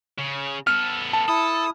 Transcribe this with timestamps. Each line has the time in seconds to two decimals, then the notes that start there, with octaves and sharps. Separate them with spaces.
0.19 C#3
0.67 B3 A4 F6
1.13 A5
1.28 E4 A4 D#6